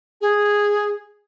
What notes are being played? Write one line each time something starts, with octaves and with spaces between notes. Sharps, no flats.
G#4